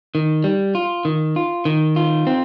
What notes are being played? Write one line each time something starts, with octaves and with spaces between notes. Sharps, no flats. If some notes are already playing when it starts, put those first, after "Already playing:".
D#3
G3
F4
D#3
F4
D#3
F4
C4